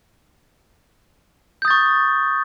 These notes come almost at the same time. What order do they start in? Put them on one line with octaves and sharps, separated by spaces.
G6 D#6 A6 C#6